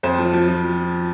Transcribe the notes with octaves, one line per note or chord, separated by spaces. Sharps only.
F2 C5
F3
F3
F3